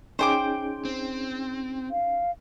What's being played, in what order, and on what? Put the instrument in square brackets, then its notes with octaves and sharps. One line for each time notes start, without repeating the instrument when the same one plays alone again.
[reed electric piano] C#4 D#4 G#4 [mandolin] C5 G5 D6
[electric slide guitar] C4
[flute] F5